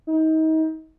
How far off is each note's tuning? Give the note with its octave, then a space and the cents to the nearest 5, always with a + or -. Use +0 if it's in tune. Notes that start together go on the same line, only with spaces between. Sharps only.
D#4 +30